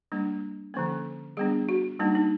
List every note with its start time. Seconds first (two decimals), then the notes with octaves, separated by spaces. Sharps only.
0.12 G3 A#3 D4
0.74 D3 F3 A#3 C#4
1.37 G3 B3 D4 G#4
1.69 F#4
2.00 G3 A#3 D4 D#4
2.15 D#4